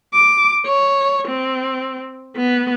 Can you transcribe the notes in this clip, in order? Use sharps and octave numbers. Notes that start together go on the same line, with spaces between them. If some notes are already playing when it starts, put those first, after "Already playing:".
D6
C#5
C4
B3